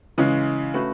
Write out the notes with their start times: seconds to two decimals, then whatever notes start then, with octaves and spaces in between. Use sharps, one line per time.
0.18 C#3 E3 G#3 C#4
0.74 A3 C#4 F#4 B4